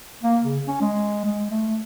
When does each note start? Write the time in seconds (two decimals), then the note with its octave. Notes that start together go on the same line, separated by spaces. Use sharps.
0.23 A#3
0.43 C#3
0.67 C#4
0.81 G#3
1.25 G#3
1.50 A3